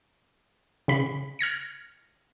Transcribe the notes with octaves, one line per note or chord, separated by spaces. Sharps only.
C#3 B5
F6 G#6 A#6 C#7